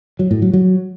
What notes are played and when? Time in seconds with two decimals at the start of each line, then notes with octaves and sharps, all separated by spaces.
0.19 F#3
0.31 A2
0.42 F#3
0.53 F#3